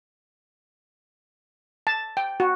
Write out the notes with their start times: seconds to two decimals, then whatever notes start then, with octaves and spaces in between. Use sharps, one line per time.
1.87 A5
2.17 G5
2.40 F#4